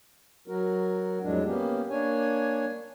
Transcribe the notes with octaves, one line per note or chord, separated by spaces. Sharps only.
F#3 F#4 A#4
F2 A2 F#3 G#3 D4
A#3 B3 C#4 G4
A#3 D4 C#5 G#5